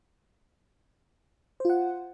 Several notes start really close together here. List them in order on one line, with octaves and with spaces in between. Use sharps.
C5 F4 F#5